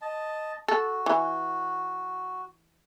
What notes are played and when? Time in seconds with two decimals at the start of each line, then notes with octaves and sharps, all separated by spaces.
0.02 D#5 A5
0.68 F#4 A4
1.06 E3